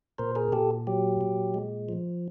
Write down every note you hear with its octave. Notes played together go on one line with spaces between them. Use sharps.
A#2 A#4 C5
G#4 A#4
A#2 G4 A4
F#3 G4
A#2
G#3
F3